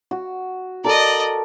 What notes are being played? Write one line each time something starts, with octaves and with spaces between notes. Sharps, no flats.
F#4
A4 A#4 D5 D#5